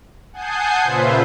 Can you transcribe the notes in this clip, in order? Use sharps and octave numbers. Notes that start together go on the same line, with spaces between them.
F#5 G#5 A5 D#6 G6 C7
A#2 C#3 F4 B4 C5 E5